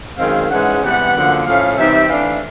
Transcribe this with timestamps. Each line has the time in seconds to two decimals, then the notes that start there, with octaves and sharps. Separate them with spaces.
0.18 F#2 D#3 G#3 C4 F5
0.50 G#2 E3 G#3 C#4 F#5
0.82 C3 E3 G3 B3 F#5
1.14 F#2 D3 F3 A#3
1.46 A2 F3 A3 C#4 F5
1.77 C3 E3 G3 C4 D#4 E5
2.09 E3 A3 D4 F5